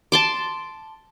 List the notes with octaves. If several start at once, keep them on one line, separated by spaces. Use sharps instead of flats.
A5 C6 D6